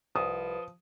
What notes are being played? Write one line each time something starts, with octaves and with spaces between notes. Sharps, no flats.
C2 F3 B4 D#6